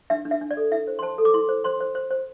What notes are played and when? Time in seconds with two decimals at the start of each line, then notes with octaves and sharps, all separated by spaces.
0.10 D4 E5
0.25 D4
0.31 E5
0.41 D4
0.51 D5
0.57 A4
0.71 E4 E5
0.87 C5
0.99 C6
1.02 C5 A5
1.18 A4
1.25 D6
1.34 E4 C6
1.49 C5
1.64 C5 C6
1.80 C5
1.95 C5
2.11 C5